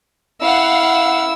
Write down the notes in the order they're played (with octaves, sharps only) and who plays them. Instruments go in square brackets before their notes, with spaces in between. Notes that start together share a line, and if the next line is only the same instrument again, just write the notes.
[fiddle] E4 E6 [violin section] F5 F#5